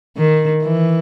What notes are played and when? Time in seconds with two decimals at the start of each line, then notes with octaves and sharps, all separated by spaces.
0.17 D#3
0.63 E3